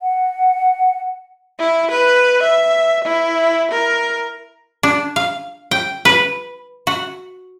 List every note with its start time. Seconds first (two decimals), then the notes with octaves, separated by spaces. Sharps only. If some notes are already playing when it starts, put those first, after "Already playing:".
0.01 F#5
1.59 E4
1.91 B4
2.43 E5
3.05 E4
3.71 A#4
4.83 D4
5.16 F5
5.71 G5
6.05 B4
6.87 F#4